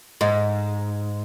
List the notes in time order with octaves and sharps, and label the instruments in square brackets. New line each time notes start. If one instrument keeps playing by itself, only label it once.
[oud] G#2